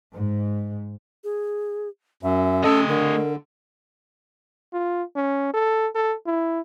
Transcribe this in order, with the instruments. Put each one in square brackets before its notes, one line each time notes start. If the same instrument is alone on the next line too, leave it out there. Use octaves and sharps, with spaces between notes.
[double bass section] G#2
[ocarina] G#4
[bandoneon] F#2 [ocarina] E5
[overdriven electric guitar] A3 D#5 [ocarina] C#4 [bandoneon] A4
[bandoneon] D3 [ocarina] A#4
[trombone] F4
C#4
A4
A4
E4